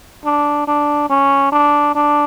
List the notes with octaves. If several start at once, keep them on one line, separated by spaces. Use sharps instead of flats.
D4
D4
C#4
D4
D4